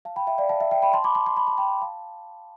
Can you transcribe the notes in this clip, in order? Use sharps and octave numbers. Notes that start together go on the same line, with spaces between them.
F5 A5
G5 B5
E5 G5
D5 F5
F5 A5
E5
E5 G5
G5 B5
A5 C6
B5 D6
A5 C6
C6
B5
A5
G5 B5
F5 A5